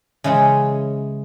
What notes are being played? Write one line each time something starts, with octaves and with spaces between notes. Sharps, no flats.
C#3 E3 G#3 C5 C#5